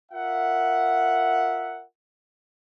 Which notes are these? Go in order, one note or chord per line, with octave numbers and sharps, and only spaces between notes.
F4 A#4 E5 F#5